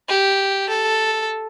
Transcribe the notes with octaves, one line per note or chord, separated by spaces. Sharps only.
G4
A4